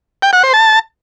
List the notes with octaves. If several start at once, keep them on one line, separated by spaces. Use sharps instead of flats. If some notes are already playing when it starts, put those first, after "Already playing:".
G5
F#5
C5
A5